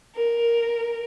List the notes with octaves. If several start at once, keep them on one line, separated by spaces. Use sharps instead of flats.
A#4